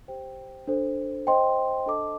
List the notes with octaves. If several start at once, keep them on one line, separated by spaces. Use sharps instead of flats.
G4 C5 G5
D4 A4 C5
C5 D#5 G5 C6
D4 A4 D#5 A5 D6